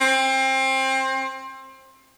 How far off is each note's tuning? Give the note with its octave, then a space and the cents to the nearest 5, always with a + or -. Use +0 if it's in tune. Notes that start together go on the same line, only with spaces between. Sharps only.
C4 +25